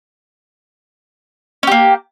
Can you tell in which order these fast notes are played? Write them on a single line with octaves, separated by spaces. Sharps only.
C#4 G4 A#3